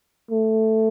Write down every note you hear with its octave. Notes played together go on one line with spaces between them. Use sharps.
A3